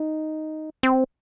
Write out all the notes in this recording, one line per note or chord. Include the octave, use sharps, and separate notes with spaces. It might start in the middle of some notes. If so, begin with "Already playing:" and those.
Already playing: D#4
C4